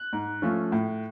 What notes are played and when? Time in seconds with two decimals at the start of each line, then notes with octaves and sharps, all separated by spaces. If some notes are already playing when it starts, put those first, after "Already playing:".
Already playing: F#6
0.13 G#2
0.42 F3 A3 C#4 F4
0.72 A2